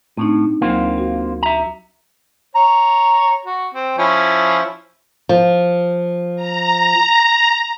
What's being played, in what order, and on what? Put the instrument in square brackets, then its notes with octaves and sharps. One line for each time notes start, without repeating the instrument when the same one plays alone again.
[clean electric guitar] A2 [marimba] C4 D4 D#4
[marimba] D2 F#3 [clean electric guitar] A#3 C4 F4
[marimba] F#4
[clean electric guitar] E5 A#5
[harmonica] C#5 A#5
F#4
C4
F3 C#4 E4
[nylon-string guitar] F3
[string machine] A#5